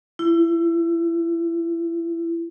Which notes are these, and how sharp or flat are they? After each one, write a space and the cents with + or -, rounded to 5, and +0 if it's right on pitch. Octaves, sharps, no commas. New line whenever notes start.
E4 +30